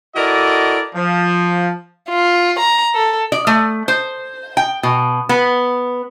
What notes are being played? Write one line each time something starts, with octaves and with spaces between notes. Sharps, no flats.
E4 F#4 A4 A#4 D5 D#5
F3
F4
A#5
A4
D5
A3
C5
G5
B2
B3